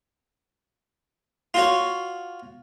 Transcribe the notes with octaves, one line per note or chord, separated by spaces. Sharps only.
F4 F#4 C#5